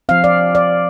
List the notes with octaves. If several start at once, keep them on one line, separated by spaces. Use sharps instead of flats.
F3 C4 F5
D5
D5